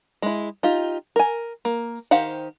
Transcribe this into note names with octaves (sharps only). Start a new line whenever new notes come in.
G#3 E4
D#4 F4 G4
A#4 G#5
A#3
D#3 G4 C5 F5 F#5